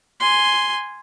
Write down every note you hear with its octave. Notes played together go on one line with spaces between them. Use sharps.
G#5 C6